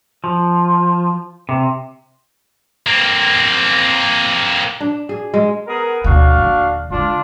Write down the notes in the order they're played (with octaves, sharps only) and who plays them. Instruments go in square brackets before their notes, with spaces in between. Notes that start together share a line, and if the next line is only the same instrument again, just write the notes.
[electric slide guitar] F3
C3
[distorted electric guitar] A#3 C4
[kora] D4
G#4
G#3
[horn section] B3 G#4 A#4
[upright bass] D2 B2 [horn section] D4 F#4 F5
[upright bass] D#1 D3
[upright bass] D3 G#3 [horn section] D4 F4